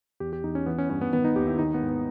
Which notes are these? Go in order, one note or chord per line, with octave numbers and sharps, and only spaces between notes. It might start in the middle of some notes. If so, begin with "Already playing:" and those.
E2 G4
G4
E2 D#4
C#4
E3 B3
C#4
G2 C#4
B3
D#3 B3
D#4
D#2 G4
E4
D#3 D#4
B3
G#2
B3